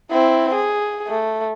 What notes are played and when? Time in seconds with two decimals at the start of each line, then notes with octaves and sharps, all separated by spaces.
0.11 C4 E4
0.55 G#4
1.08 A3